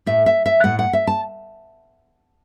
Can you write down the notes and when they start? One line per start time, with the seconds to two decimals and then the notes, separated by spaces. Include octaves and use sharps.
0.06 A2 A3 E5
0.26 E5
0.46 E5
0.64 A2 A3 F#5
0.79 F#5
0.93 E5
1.07 A5